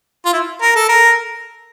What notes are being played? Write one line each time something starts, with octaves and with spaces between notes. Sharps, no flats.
F4
E4
A#4
A4
A#4